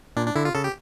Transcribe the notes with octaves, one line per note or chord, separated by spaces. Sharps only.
A#2 D4
D4
D3 E4
F4
C#3 A4
G4